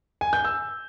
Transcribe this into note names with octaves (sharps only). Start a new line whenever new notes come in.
G#5
G6
E6